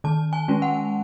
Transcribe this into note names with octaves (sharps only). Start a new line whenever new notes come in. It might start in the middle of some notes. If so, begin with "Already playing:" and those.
D#3 A5
G#5
G#3 C#4
F#5